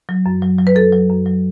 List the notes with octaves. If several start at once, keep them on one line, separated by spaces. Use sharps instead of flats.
F#3
F#2
F#3
F#3
B4
F#2 A4
F#3
F#2
F#3